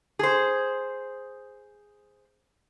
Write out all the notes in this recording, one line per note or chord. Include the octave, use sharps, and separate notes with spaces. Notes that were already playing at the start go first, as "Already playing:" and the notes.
G#4 C5